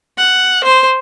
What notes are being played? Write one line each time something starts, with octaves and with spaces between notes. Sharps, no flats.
F#5
C5